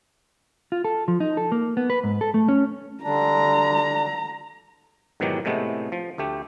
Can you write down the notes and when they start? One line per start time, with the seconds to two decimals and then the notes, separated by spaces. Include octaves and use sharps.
0.72 F4
0.85 A4
1.08 F3
1.20 D#4
1.37 A4
1.52 A#3
1.77 B3
1.90 B4
2.04 G#2
2.21 A4
2.34 A3
2.49 C#4
3.04 D3 G3 D4 A#5
5.20 G#2 B2 D#3 E3 F#3 G4
5.45 A2 C3 G#3 A3 B3
5.92 F3
6.18 D2 A3 G4